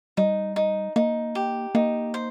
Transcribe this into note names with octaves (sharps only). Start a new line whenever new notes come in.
G3 D#4
D#4
A#3 D#4
G4
A#3 D#4
C5